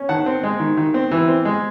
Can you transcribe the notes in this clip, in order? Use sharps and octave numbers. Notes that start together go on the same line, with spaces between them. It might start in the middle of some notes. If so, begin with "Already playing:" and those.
Already playing: C#4
D#3 F#5 A5
C4
G#3
D#3
D#3
C4
E3
C4
G#3